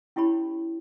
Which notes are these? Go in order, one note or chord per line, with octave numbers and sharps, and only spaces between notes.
C#4 E4 G4 C#5 B5